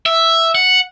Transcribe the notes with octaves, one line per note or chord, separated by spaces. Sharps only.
E5
F#5